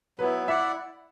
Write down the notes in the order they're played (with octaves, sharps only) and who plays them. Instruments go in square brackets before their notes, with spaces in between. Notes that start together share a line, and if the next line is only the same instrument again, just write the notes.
[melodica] F#3 B3 E4 [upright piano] B4
[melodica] E4 D5 F#5 [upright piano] E5